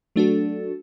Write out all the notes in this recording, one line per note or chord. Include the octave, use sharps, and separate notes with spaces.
F#3 A3 D4 F#4 A4